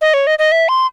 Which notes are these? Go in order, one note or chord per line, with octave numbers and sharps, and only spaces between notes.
D#5
C#5
D#5
D#5
E5
C6